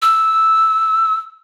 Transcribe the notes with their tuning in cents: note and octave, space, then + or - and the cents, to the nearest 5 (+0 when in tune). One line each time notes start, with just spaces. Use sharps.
E6 -5